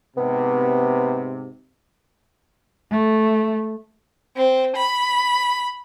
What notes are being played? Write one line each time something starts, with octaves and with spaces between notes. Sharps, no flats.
G#2 C3 B3
A3
C4
B5